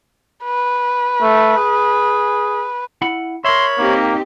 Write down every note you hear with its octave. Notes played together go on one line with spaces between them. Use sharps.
B4
A3
G#4
E4 F#5 B5
A#4 C#5 E5 B5 C6
A#3 C4 D#4 G4